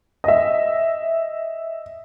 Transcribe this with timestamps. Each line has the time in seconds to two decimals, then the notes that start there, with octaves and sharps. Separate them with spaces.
0.24 D#5 E5